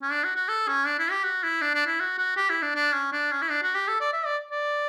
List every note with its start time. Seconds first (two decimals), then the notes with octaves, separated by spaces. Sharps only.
0.02 C#4
0.12 D4
0.24 F#4
0.36 F#4
0.49 A4
0.68 C#4
0.87 D4
0.99 E4
1.11 G4
1.24 F#4
1.43 E4
1.62 D4
1.75 D4
1.87 E4
2.00 F#4
2.18 F#4
2.37 G4
2.50 E4
2.62 D4
2.76 D4
2.93 C#4
3.12 D4
3.32 C#4
3.42 E4
3.51 D4
3.63 F#4
3.75 G4
3.88 A4
4.01 D5
4.13 E5
4.26 D5
4.51 D5